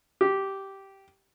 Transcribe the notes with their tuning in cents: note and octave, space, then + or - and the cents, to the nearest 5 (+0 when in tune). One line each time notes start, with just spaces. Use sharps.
G4 -10